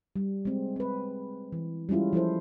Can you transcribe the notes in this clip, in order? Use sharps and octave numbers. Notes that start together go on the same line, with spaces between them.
G3
G#3 C4
C4 B4
E3
G3 G#3 C#4 E4 F4
F3 E4 A4 C5